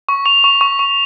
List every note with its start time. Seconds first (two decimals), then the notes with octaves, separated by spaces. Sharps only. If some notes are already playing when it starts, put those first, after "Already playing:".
0.09 C#6
0.26 C#6 F7
0.44 C#6
0.61 C#6
0.79 C#6